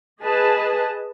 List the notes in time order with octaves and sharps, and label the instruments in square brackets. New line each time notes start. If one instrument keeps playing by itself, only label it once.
[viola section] G#4 B4 D#5 A5